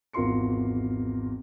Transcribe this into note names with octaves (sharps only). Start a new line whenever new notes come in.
G#1 E2 F4 A#4 C6 C#7